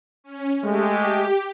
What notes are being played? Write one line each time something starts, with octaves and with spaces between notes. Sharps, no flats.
C#4
G#3 A3 G4